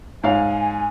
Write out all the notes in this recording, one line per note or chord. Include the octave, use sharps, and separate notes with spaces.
G#2 C#5 F5 G#5